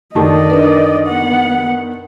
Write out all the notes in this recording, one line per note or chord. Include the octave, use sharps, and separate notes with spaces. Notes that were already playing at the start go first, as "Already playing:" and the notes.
F#2 D3 D#3 D5 D#5 A5
D4 A#4 B4
B3 F#5